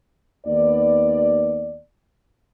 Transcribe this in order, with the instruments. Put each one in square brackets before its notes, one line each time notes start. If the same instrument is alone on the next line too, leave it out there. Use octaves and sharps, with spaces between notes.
[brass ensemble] D#2 B3 D5